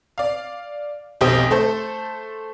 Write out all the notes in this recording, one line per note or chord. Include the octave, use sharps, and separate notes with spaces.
D5 F5
F1 B1 G4 C5 D#6
A3 A4 C5